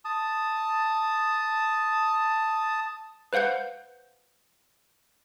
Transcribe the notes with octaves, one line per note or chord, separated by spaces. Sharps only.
A5 D#6
B4 C5 F5 F#5 G6